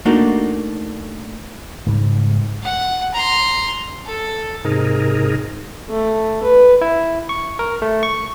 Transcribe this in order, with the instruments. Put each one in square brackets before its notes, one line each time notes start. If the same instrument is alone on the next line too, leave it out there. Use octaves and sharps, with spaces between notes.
[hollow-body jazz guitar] A3 A#3 D4 D#4 F#4
[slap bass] G#2 C#3 G3
[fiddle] F#5
A#5 C6
A4
[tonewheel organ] G#2 C3 D#4 G#4 A#4
[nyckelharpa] A3
B4
[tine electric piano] E4
C#6
A#4
A3
C#6